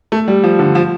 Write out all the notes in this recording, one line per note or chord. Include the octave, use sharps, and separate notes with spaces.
A3
G3
F3
D3
F3